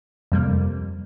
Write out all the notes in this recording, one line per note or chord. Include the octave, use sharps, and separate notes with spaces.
F2 C3 G3 A#3